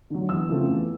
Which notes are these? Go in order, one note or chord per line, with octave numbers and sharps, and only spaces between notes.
D3 F#3
E2 E6
C#3 F3 A3 C4
E2